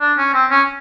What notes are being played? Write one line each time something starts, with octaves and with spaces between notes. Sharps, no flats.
D4
C#4
C4
C#4